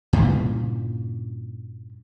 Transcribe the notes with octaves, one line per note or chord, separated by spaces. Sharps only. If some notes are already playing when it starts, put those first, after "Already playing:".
G2 A#2 C#3 E3